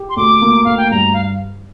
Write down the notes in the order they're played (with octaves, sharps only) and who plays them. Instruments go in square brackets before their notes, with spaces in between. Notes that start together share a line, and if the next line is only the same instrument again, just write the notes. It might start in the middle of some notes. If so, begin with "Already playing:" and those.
Already playing: [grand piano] G4
[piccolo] C6
[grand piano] D2 [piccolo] D6
[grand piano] A#3
[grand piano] D2 [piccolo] F5
[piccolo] G5
[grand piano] G2 [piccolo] A#5
[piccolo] F5